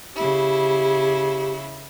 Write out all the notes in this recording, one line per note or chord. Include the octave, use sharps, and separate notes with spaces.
C#3 E4 G4